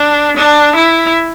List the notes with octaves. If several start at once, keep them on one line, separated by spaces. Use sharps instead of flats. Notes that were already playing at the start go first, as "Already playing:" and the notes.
Already playing: D4
D4
E4